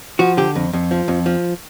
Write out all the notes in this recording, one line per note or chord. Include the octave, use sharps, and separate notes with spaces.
F3 F#4
D3 G4
F2
F2
F3
F2
F3